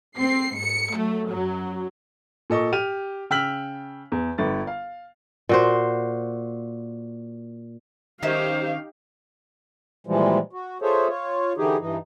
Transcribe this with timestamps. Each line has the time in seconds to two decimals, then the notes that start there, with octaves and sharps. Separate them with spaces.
0.16 C4 C7
0.55 G#2 C#7
0.94 F#3 A3
1.31 F#2 F#3
2.50 A#2 A4 D#5 C#6
2.73 G4 F6 D#7 F7
3.30 C#3 G5 E6 F6 B6 F#7
4.12 E2
4.38 G1 D3 A6
4.67 F5
5.49 A#2 F#4 C5
8.23 D#3 C#4 D#4 G4 C5 E5 F5
10.07 A#2 E3 F3 G3 G#3
10.53 F#4
10.82 F4 G#4 A4 C5 C#5 E5
11.08 F4 C#5
11.57 D3 E3 D#4 G4 G#4
11.80 G2 E3 D#4